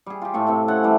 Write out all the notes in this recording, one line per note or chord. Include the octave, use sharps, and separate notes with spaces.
G3 G#4
F4 G4
A2 A3 F4 C#6
A2 C3 C#5
C4 C#4 A4 F#5
C3 E3 G3 A3